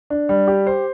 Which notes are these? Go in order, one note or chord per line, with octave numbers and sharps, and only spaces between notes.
D4
G3
G4
C5